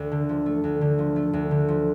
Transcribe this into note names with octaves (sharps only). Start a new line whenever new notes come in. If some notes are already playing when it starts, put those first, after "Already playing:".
Already playing: D2
D3
F3
A3
D2
D3
F3
A3
D2
D3
F3